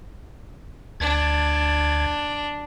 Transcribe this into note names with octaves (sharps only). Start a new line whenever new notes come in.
D2 D4 G#6 A6